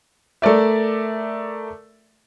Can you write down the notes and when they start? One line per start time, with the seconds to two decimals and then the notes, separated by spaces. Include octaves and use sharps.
0.42 A3 A#4 D5 E5